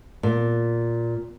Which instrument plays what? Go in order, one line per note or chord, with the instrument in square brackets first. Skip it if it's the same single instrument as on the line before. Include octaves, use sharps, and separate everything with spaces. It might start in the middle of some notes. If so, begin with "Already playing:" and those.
[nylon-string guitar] A#2